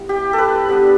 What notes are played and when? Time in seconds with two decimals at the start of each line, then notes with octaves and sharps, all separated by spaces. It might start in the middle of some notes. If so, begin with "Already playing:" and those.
Already playing: G3 B3 E4
0.09 G4
0.33 A4
0.38 B4
0.68 G3 B3 D4